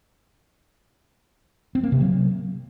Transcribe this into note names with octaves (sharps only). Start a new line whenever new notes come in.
C4
A#3
C3
F#3